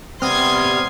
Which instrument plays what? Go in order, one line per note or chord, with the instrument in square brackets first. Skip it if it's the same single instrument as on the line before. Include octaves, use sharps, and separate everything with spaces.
[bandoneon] C3 G3 B3 [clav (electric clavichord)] C4 [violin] C6 G#6 [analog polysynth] D#6 F6